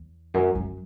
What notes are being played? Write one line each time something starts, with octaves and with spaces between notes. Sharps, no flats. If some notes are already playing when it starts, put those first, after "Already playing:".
Already playing: E2
F#2
F#2